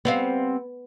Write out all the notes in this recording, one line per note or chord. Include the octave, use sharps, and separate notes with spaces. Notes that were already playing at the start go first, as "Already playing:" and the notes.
G3 B3 C4 F5